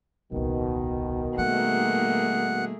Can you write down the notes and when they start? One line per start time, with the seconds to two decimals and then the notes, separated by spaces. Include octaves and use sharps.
0.32 D#1 C2 B2 D#3
1.38 G3 A3 A#3 G#4 F#5